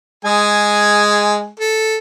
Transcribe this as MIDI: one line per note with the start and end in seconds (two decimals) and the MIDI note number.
0.25 1.49 56
0.25 1.49 68
0.25 1.49 80
1.59 1.97 69